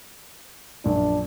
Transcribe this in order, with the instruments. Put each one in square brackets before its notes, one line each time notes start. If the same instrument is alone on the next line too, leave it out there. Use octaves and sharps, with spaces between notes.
[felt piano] A#1 F#2 F3 [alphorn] D4